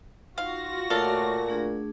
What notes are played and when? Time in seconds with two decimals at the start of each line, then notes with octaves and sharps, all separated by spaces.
0.38 D#4 F4 F#4 F5 A#6
0.90 A#2 A3 A4 C#5 D5 E5 F5
1.48 A3 D4 G#4